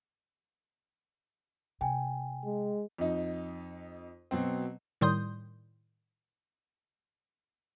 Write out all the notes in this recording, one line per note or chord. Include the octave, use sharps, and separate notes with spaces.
C3 G5 G#5
G#3
F2 D#4
B2 F#3 C4
A2 D#3 G3 C6 D#6 G6